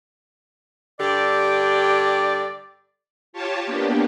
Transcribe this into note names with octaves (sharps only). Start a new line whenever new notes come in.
G2 D3 G4 D5
F4 G4 C#5 A5
A#3 B3 D4 G4